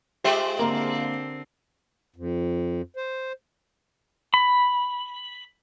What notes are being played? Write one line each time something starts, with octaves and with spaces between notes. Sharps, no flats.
G#3 F4 G4 C5 E5
D3 A#3 C4 A#4
F2
C5
B5